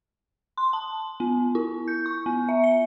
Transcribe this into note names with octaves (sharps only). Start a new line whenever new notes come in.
C6
A5
B3
E4
G6
C#6
B3
E5
C#7